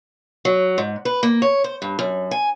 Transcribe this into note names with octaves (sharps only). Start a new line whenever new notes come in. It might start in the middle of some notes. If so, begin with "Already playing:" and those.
F#3
G#2
B4
A#3
C#5
C5
G2
F#2
G#5